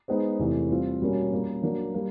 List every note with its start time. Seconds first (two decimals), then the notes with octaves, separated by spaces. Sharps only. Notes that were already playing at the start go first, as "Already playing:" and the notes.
0.08 G#3 B3 D#4 G#4 C5
0.38 E2 C3 E3 A3
0.70 G3 C4 F4
1.01 B2 G3 A#3 C#4
1.32 A#2 G3 A#3 C#4
1.63 F#3 A#3 D4
1.94 G3 A#3